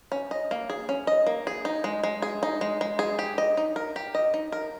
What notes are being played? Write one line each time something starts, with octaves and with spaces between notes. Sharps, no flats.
C#4
D#5
A#3
G#4
C#4
D#5
A#3
G#4
D#4
G#3
G#3
G#4
D#4
G#3
G#3
G#4
G4
D#5
D#4
A#4
G4
D#5
D#4
A#4